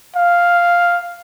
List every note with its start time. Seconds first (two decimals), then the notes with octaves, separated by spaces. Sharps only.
0.16 F5